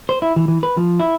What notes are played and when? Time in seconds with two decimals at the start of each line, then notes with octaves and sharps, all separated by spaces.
0.09 C5
0.22 E4
0.36 E3
0.48 E3
0.63 B4
0.77 F3
1.00 E4